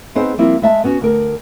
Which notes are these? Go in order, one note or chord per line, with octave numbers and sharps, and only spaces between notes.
B3 C4 D#4 G#4 C5
F3 G3 A#3 C4 E4 F4
G#3 E5 A5
B3 C#4 F#4
D2 A#4